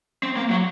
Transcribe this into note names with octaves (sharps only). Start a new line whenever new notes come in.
C4
A#3
F#3